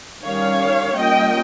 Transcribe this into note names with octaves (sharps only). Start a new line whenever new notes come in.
D#3 G3 C#4 C#5 F5
G3 A#3 C#4 F4 D#5 G5